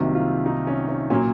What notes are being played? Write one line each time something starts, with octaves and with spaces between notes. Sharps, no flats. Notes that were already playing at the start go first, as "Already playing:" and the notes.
Already playing: C2 C3 D#3 F#3 A#3
F4
D#4
C#4
C#4
A#2 F#3 A#3 C#4